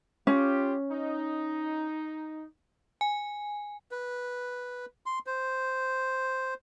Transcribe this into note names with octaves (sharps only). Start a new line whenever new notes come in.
C#4 F4 G4
D#4
G#5
B4
C6
C5